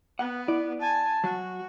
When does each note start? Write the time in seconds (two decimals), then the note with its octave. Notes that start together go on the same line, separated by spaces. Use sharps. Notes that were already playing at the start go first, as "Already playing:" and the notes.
0.19 B3 F#5
0.48 E4 D5
0.81 G#5 A5
1.24 F#3 F#4